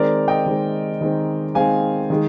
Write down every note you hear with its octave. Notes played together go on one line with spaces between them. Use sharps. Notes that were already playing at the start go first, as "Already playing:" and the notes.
Already playing: D#3 G#3 C4 A#4 D5
D#5 G5
D#3 G#3 C4
D#3 G#3 C4
D#3 G#3 C4 F5 G#5
D#3 G#3